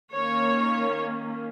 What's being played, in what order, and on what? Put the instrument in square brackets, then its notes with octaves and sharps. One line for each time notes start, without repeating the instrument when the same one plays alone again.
[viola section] D#3 A#3 C#4 C#5